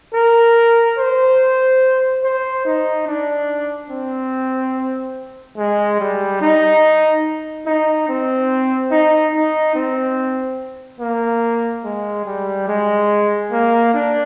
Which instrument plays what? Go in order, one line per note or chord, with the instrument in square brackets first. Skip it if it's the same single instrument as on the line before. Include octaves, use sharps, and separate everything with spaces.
[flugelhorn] A#4
C5
C5
D#4
D4
C4
G#3
G3
D#4
D#4
C4
D#4
D#4
C4
A#3
G#3
G3
G#3
A#3
D4